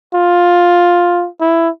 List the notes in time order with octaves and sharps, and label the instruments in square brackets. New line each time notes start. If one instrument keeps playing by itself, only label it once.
[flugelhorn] F4
E4